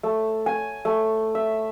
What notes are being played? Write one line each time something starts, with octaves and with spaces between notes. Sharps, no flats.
A3
G#5
A3
E5